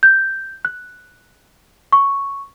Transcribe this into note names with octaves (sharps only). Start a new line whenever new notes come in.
G6
F#6
C#6